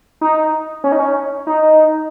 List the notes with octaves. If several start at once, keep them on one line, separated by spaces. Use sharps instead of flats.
D#4
C#4
D#4
C#4
D#4